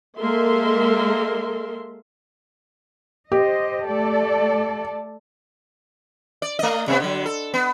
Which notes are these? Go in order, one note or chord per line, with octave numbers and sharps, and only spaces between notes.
G#3 A#3 A4 A#4 E5 C6
G4 C5 D#5
A3 A4 D5
D5
A3 D#5
C3 A3 B3
D3 F#3
A4
B3